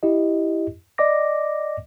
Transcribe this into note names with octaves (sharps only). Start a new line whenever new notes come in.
E4 G4 D#5
D5 D#5 D6 A#6